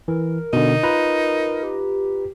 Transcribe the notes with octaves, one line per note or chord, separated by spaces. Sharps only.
E3 A#4
B2 D3 D#4
F4 B4 A#5
G4